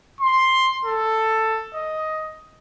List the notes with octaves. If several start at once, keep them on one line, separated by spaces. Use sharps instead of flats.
C6
A4
D#5